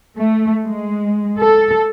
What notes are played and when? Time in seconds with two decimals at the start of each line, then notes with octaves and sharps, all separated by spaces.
0.18 A3
0.63 G#3
1.39 A4